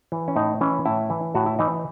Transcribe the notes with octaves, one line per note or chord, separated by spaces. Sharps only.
E3
C#4
A2 D#4
E3 C#4
A2 E4
E3
A2 F#4
E4
E3 D#4